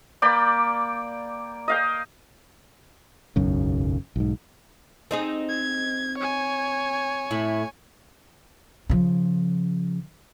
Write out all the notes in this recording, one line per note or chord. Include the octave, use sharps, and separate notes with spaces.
A#3 D5 G5 B5
D#5 F5 G5
E1 B1 F#2 C#3
B1 G#2
C4 D#4 G#4
G#6
C#5 G#5
A2 E4
C#3 F3